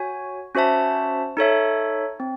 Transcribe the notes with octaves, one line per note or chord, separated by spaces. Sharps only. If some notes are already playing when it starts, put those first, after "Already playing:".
Already playing: F#4 C#5 G#5
C#4 F#4 C5 E5 A5
D#4 A4 C#5 E5
C4